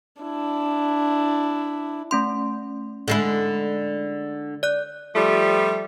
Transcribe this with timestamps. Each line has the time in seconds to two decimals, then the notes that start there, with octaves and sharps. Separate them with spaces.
0.22 D4 E4
2.11 A3 C#4 C6
3.08 D3 G#3 E4
4.63 D5 F#6
5.15 F3 G3 A3